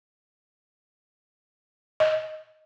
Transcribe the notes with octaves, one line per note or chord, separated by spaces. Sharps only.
D#5